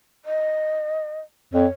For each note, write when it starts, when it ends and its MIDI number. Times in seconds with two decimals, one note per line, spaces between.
0.25 1.20 75
1.53 1.66 41
1.53 1.69 73